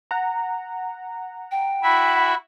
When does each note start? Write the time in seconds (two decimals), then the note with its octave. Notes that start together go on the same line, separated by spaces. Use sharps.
0.11 F#5 A#5
1.51 G5
1.83 E4 F#4 E5 B5